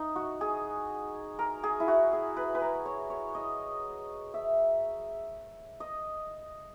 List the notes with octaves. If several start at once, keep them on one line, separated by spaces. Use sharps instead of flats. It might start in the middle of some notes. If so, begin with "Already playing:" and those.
Already playing: D#4
F#4
G#4
A#4
G#4
E4
F#4
G#4
B4
B4
A#4
C#5
C#5
D#5
E5
D#5